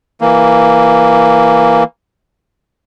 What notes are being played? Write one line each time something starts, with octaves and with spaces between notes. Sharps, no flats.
E3 A#3